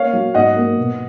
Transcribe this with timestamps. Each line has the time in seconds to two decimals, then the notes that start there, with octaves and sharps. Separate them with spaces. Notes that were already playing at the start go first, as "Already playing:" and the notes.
Already playing: A#3 C#5 F5
0.13 F#3
0.34 G#2 D#5 F#5
0.56 A#3
0.77 B2